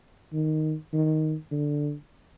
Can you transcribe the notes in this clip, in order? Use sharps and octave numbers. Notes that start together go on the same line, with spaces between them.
D#3
D#3
D3